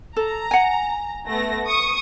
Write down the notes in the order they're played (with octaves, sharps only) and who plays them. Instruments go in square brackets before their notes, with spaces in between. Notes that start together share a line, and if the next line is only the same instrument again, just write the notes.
[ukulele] A4 [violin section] A#5
[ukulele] F#5 G#5
[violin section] A3 B3 A#6
C#6 D#6 C#7